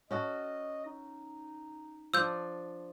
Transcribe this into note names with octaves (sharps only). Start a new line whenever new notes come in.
C#4 F#4 A4 D#5
D#4
F3 D4 E6 G6